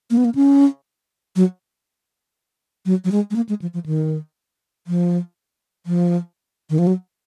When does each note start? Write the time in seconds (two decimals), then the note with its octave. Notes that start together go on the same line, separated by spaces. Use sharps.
0.11 A#3
0.17 B3
0.25 A#3
0.35 C#4
1.36 F#3
2.86 F#3
3.04 F#3
3.12 G#3
3.31 G#3
3.36 A#3
3.49 G#3
3.62 F3
3.74 F3
3.86 D#3
4.87 F3
5.86 F3
6.70 D#3
6.78 F3
6.87 F#3